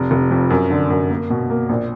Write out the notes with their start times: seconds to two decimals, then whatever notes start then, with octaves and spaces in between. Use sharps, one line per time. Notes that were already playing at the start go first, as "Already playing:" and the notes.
Already playing: F1
0.11 F1
0.31 F2
0.50 F#2
0.70 D3
0.90 F#2
1.10 A#3
1.30 B2
1.50 A#3
1.69 A#1